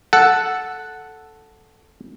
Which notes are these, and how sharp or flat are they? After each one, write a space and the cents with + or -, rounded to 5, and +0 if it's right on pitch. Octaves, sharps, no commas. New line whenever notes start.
A4 +0 F#5 +0